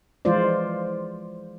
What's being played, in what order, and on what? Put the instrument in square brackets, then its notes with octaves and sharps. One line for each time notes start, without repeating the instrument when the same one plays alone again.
[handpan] E3 F3 G#3 F4 C5 D5